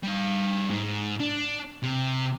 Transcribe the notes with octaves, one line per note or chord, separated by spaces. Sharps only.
G3 F5
G#2
D4
C3